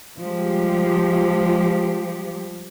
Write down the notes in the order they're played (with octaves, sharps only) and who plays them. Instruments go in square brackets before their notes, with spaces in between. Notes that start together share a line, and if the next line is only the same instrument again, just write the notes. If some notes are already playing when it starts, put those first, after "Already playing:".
[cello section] F3 G3 G#3 G4